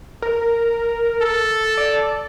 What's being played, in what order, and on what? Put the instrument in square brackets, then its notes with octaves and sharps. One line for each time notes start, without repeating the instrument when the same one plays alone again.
[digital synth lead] A#4
[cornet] A4
[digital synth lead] D5